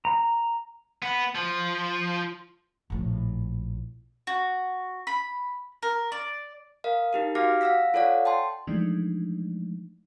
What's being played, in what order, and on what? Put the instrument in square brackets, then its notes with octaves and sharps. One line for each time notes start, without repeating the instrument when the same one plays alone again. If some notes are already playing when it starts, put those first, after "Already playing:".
[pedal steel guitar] A#5
[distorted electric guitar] B3
F3
[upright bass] A#1 A2
[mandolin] F#4
B5
A#4
D5
[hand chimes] A#4 D#5 F5
D#4 G4 A#4
F#4 G4 F5 D6 F6 A#6
F5 F#5 E6 A#6 B6
F4 A4 C#5 D5 F5 F#5
G5 A5 C6
[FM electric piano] E3 F3 G#3 A3 D4 D#4